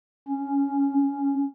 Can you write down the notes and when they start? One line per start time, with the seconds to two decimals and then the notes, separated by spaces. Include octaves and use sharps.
0.28 C#4
1.02 C#4